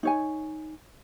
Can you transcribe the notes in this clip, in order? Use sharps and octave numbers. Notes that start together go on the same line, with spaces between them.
D#4 C#5 G#5